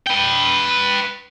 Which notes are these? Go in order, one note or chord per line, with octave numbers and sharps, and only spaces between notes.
B4 G5